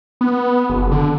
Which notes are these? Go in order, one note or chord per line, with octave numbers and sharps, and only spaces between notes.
B3
F#1
D3